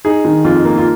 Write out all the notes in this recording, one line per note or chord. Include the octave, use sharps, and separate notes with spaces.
D#4 G#4
D#3
F2 F4
A#3
F4